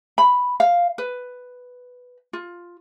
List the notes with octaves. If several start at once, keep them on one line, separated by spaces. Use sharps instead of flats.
B5
F5
B4
F4